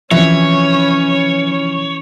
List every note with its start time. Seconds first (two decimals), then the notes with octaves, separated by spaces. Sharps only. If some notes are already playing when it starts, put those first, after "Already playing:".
0.11 C3 E3 F3 C#4 C#5 E5